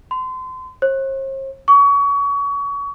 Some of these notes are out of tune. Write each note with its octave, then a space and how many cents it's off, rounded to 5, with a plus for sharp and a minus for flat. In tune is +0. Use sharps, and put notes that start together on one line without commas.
C6 -30
C5 +45
C#6 +30